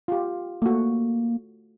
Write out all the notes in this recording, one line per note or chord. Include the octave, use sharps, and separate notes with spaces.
F4 G4
A3 A#3 F#4